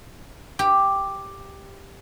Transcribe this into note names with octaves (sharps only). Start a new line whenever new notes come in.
G4